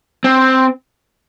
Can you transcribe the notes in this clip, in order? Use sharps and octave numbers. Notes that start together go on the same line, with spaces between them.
C4